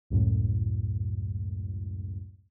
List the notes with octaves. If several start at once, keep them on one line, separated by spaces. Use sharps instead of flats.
C#2 F#2 A2